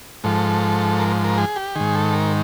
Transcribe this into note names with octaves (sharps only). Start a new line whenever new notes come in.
G#2 F3 A4
A#4
A#4
G#4
G4
G#2 D#3 G#4
A4
A#4